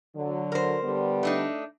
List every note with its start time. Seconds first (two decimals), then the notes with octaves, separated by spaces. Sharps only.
0.16 D3 F#3
0.52 A#4 C5
0.83 D3 G3 B3
1.23 A3 D4 D#4